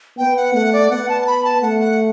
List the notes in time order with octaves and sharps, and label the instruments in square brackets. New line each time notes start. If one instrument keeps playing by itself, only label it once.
[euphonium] B3 [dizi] G5
[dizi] F#5
[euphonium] A3 [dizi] F#5
[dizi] D5
[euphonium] B3 [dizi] F#5
[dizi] A5
A5
B5
A5
[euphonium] A3 [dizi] F#5
[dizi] F#5